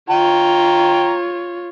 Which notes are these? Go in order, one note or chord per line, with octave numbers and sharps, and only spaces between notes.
F4 C#5 G5 A#5